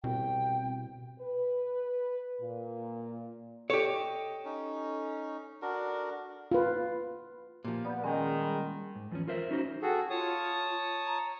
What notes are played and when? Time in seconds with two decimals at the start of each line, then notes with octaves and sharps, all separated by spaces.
0.04 C2 B2 G5
1.20 B4
2.41 A#2
3.70 G4 A4 C#5 D#5
4.45 C#4 D#4
5.62 D4 F#4 A#4
6.51 F4 B4
7.65 A#2 F3 G4
7.85 B3 D5 G6
8.04 D#3 G#3 C#4 F#5
8.41 G3 B5
8.96 G#2
9.12 E2 F3 C#4
9.28 F4 A#4 C5 E5
9.51 C#4 D#4 F#4 C5
9.82 F#4 G#4 A4 G5
10.10 F4 C#5 A5 D#6
11.07 A#5